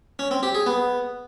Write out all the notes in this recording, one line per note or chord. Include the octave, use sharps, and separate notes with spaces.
C#4
C4
G4
G#4
B3